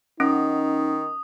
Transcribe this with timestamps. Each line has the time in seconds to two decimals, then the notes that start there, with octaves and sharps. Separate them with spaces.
0.20 D#3 C#4 D#4 D#6